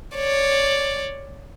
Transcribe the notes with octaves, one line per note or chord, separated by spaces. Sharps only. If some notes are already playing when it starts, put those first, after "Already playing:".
C#5 D5